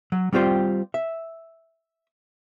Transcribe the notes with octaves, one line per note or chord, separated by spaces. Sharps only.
F#3
G3 C4 F4 G4 C5
E5